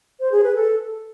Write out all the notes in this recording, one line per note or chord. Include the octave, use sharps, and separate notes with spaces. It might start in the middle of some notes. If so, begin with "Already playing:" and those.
C5
G#4
B4
A4